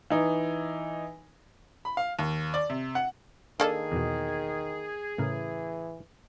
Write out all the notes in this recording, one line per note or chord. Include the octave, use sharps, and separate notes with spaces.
E3 D#4
B5
F5
D#2
D5
C3
F#5
D#3 A#3 D4 G#4 A4 D#5
E2 B2
A2 C#3 E3 A#4